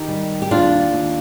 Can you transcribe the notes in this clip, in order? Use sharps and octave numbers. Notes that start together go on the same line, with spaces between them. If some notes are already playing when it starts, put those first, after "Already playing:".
Already playing: D#3 D#4 G4
G3
G4
D#2 D4 F4
D#2